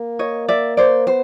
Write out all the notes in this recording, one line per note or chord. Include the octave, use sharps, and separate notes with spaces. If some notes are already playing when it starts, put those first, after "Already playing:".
Already playing: A#3
C#5 D#5
D5 E5
C5 D5
B3 C5